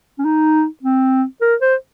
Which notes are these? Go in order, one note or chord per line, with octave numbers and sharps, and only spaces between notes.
C#4
D#4
C4
A#4
C5